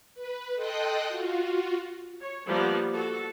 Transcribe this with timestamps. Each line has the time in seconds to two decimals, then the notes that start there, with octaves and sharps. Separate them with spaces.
0.15 B4
0.55 A4 D#5 G5 C6 D#6 F#6
1.08 F4 F#4
2.19 C#5
2.48 F3 G3 A#3 B3
2.92 F#4 A4